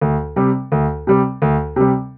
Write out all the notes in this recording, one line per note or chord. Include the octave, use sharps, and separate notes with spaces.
D2
C3 G3
D2
C3 G3
D2
C3 G3